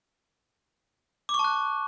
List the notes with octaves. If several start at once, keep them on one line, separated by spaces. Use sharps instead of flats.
D6
C#6
A5
F#6